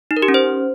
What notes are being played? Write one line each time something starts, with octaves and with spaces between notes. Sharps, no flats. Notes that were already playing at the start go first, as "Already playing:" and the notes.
D#4
A#4
G4
C#4
C5